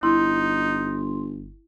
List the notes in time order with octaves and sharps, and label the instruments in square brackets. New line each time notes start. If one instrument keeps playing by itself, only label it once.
[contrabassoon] G1 [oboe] D#4 [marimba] E4 [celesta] C6